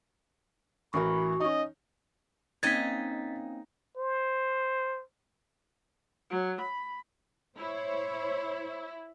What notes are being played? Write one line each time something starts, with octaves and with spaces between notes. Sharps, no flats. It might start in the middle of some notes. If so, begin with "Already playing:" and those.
A1 E3 F#4 A#4 B5
C#4 D#4 D#5
A#3 C4 C#4 D#4 D#5 G#6 A6 B6
C5
F#3
B5
E4 C5 C#5